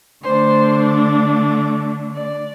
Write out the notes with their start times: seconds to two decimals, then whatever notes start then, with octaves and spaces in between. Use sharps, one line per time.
0.23 D3 A3 D4 C5
2.14 D5